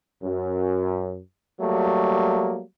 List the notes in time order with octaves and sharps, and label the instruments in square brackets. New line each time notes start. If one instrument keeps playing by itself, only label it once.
[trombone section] F#2
F#3 G3 A3 A#3